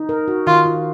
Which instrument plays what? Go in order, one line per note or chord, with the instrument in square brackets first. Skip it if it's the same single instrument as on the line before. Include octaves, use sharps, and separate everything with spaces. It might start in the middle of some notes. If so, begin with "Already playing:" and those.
Already playing: [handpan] D#4
A#4
F#4
[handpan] D#3 [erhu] F4
[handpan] F4